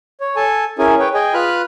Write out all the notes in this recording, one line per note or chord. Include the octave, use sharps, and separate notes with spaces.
C#5
A4 G#5 A5
C#4 E4 G#4 A#4 G#5
B4 C#5 G5
G#4 D#5 G5 G#5
F4 B4 B5 F6 F#6